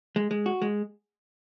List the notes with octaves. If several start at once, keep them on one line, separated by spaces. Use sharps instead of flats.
G#3
G#3
F#4
G#3